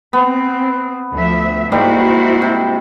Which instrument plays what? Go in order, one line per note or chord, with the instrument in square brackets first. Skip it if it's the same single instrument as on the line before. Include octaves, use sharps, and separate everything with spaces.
[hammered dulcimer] B3 [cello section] C4
[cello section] D2 F3 E5
[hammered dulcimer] G#2 G3 A#3 [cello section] E4 F#4 C5
[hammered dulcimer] C3